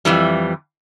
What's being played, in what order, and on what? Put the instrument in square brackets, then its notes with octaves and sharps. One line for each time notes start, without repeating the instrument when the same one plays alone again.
[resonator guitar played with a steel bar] F2 G#2 E3 G3